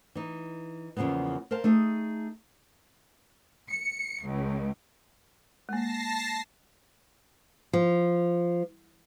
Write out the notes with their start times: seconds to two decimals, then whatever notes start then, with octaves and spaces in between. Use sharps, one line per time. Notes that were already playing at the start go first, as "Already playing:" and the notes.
0.15 E3 D#4
0.97 E2 C#3 F3 A#3 B3
1.51 A#4 C5 F5 A5
1.64 A3 D#4 G#4
3.71 C#7
4.26 C#2
5.69 G#3 A#3 A5 A#6 C7
7.73 F3